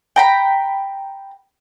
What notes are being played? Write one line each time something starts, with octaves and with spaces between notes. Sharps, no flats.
G5 A#5 B5